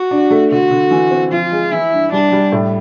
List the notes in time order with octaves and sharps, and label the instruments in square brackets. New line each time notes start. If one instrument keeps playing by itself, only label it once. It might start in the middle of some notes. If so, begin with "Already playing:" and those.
Already playing: [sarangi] F#4
[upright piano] D4
A3
[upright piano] D3 [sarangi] F#4
[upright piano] D3
E3
C4
[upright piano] F3 [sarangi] F4
[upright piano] G#3
[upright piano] E3 [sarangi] E4
[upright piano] G2
[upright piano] G3 [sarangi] D4
[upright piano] G3
A2